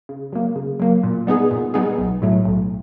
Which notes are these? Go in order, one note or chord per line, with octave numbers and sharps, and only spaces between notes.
C#3
F#3 A#3
C#3
F#3 A#3
A#2
G3 B3 D#4 G#4
A#2
G3 B3 D#4 G#4
B1
A2 F#3 A3
B1